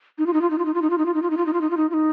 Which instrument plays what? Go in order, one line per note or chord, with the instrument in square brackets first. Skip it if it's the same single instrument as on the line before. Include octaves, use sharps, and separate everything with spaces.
[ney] D#4
F4
D#4
F4
D#4
F4
D#4
F4
D#4
F4
D#4
F4
D#4
F4
D#4
F4
D#4
F4
D#4
F4
D#4
F4
D#4